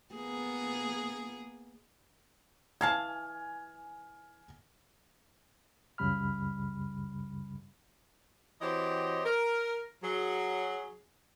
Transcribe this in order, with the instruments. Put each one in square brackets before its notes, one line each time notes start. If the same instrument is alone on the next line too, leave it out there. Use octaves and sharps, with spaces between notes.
[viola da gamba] A#3 B3 G#4
[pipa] E3 F5 A5 [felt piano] G#5 F6 G#6
[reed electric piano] C#2 F#2 C#3 G3 B5 F6
[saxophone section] E3 C4 F#4 G4 C#5 D#5
A#4
F#3 G#4